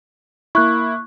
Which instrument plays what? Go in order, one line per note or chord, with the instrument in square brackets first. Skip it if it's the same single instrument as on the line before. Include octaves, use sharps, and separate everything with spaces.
[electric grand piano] A#3 E4 [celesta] C#6 F#6